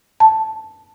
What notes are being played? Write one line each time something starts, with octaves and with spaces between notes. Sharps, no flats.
A5